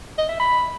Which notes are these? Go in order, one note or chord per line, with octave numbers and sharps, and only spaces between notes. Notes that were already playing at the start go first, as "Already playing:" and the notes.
D#5
E5
B5